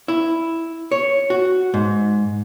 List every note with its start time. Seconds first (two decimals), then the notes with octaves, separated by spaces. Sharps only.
0.08 E4
0.92 C#5
1.30 F#4
1.74 G#2